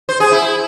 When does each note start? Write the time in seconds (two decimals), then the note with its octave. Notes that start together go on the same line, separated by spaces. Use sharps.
0.09 C5
0.20 G#4
0.32 E4